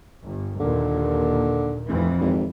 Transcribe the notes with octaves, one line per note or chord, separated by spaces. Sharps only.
G1
D#2 A#2 D3
F1 F2 E3
G#1